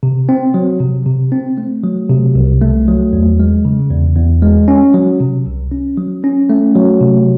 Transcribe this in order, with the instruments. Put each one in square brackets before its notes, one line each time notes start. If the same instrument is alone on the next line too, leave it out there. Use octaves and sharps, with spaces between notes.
[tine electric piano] C3
C4
F#3
C3
C3
C4
A3
F#3
C3
C2
A3
F#3
E2
G#3
C#3
E2
E2
G#3
C#4
F#3
C3
C2
C#4
F#3
C#4
A3
F#3
C3